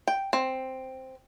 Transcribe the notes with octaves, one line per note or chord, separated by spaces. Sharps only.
G5
C4